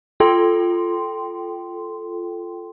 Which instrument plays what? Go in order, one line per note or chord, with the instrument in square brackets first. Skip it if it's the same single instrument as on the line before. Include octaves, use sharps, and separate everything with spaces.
[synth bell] F4 A4 G5 C6